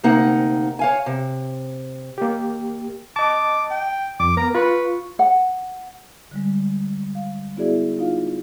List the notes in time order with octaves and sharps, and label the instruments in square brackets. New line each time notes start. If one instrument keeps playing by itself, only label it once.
[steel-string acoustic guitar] D2 C3 A#3 D#4 F#5 G5
C#5 F5 G#5
C3
[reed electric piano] A#3 G4
[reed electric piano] D#5 A5 [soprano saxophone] D6
[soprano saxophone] G5
[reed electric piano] F2 [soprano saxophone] D6
[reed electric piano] B3 A#4 [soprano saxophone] A#5
[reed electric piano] F4 C#6 [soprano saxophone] B4
[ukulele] F#5
[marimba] D3 G3 G#3
F5
B3 E4 F#4 G#4 D5 E5
D#4 F4 F5